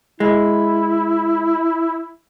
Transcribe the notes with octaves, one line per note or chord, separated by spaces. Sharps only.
G#3 E4